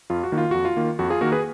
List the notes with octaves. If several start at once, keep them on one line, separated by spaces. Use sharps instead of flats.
F2 F4
F#4
D#3 A#3
F4
F2 F#4
F4
D#3 A#3
F2 F#4
F4 G#4
D#3 A#3 F#4 A#4
G#4 B4